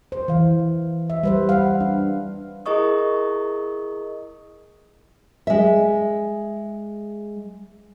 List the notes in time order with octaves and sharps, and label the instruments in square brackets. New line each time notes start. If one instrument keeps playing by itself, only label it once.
[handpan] C5
E3 F5
E5
G3 B4 C5
F5 F#5
D4
[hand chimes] E4 G#4 A#4 D#5 C#6 D#6
[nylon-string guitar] G#3 E5